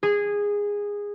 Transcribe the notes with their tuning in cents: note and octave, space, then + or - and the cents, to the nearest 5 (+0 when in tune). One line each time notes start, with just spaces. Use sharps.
G#4 -15